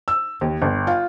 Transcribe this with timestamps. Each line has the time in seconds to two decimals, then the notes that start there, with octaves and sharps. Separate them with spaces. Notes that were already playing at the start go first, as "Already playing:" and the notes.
0.08 E6
0.41 D#2
0.62 G1
0.87 F4